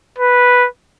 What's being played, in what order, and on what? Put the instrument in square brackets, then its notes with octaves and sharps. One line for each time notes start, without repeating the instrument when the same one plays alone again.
[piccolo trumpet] B4